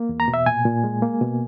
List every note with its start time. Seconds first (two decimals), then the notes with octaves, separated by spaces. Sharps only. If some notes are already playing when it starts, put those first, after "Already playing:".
Already playing: A#3
0.09 E2
0.20 A#5
0.28 B2
0.34 E5
0.46 A#2 G#5
0.65 A#2
0.84 G#3
1.02 A#3
1.21 B2